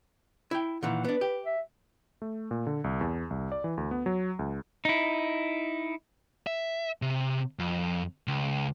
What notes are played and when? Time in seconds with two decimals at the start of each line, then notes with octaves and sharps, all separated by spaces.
0.51 E4 G5
0.83 A#2 D#3 E3 F#5
1.04 B3 D4 B4
1.21 G4
1.45 E5
2.22 A3
2.51 A#2
2.67 D3
2.84 C2
3.01 E2
3.30 C2
3.52 D5
3.64 E3
3.77 D2
3.91 B3
4.06 F#3
4.39 C#2
4.85 D#4 E4
6.47 E5
7.02 C3
7.59 F2
8.28 C#2